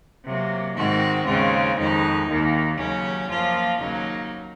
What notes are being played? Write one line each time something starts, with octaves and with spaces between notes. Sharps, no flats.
C3 F#3 A#3
G#2 D#3 G#3 C4 F#4
D#2 C#3 G#3 C4 F4
F2 D#3 G#3 D#4
D#2 D#3 A#3
D#2 C#3 F#3 C#4
F#2 F3 A#3 F4
D#2 C#3 F#3 A#3 D#4